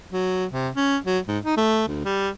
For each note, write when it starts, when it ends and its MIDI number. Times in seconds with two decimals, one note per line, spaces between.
0.12 0.45 54
0.51 0.69 48
0.75 0.97 61
1.05 1.19 54
1.27 1.39 44
1.45 1.57 63
1.57 1.86 57
1.88 2.00 38
2.05 2.29 55